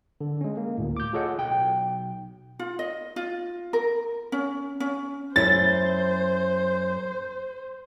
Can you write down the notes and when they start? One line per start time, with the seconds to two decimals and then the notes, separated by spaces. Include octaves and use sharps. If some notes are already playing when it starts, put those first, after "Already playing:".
0.21 D3
0.41 G#3 C#4
0.57 A#3
0.78 D2 A2
0.97 D6 G6
1.13 F4 G#4 A4 C#5 D#5 F#5
1.38 B1 G5
2.59 F4
2.79 D#5
3.16 F4
3.73 A#4
4.32 C#4
4.80 C#4
5.36 F#2 E4 C5 E5 A6